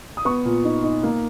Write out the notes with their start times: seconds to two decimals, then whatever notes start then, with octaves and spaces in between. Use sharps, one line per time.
0.17 D#6
0.25 B3 C#6
0.45 A#2
0.65 D#4
0.84 D#4
1.03 A#3